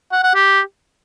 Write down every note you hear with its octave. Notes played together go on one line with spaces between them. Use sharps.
F#5
F#5
G4